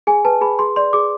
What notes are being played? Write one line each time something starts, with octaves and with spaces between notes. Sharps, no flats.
G#4 G#5
B4 A5
G#4 B5
G#4 C6
D5 C6
G#4 D6